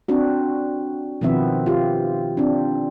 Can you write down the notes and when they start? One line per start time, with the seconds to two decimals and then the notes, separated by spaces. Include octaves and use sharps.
0.08 C4 D4 F#4
1.21 B2 D#3 F3 B3 C4 E5
1.66 F4 G4
2.37 C4 D4